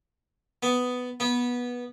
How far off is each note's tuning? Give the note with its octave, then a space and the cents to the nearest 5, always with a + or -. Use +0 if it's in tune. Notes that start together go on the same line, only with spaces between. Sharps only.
B3 +10
B3 -15